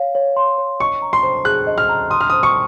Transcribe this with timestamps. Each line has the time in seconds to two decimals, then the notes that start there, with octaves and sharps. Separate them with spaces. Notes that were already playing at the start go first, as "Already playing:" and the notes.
Already playing: C#5 F5
0.15 C#5
0.37 C6
0.58 C#5
0.80 D#5 C#6
1.02 A#5
1.13 C6
1.23 C5
1.45 G#4 F#6
1.67 D#5
1.78 F6
1.89 A#5
2.10 C6 D#6
2.21 F6
2.30 C5 D#6
2.43 C#6